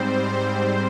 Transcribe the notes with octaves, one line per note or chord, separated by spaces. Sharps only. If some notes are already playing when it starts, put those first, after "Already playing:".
Already playing: G#2 G3 C4 C5